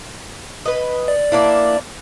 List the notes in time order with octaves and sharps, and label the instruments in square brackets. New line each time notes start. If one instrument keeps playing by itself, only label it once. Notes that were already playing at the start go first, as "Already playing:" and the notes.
[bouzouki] B4 D#5
[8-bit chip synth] D5
[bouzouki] A#3 D4 E4